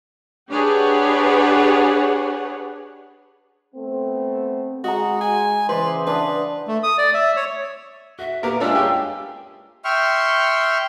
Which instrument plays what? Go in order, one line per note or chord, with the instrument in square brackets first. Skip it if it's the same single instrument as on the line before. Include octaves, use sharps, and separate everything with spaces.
[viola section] D4 G4 G#4 B4 C#5 F#5
[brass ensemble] A3 B3 C4
[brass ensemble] G#3 [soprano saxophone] F#4 [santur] D#5 F#5 A#5
[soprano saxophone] G#5
[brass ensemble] C#3 E3 [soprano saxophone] B4 [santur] C5 D5 D#5
[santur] D4 F#5 D#6 [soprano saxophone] B4
[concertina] A3
D#6
D5
E5
C#5
[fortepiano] F#4 [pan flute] E5
[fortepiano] A#2 B3 [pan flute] G4 [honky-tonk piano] A#4
[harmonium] G#3 F4 [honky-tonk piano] C#4 D4 [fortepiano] E4 A#4 [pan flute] E6
[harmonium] G2 G5 [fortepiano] G4 G#4 G#5
[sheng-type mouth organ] E5 G5 C6 C#6 F6